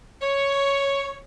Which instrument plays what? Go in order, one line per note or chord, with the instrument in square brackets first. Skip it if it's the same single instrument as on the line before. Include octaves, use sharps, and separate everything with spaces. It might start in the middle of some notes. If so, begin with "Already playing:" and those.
[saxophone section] C#5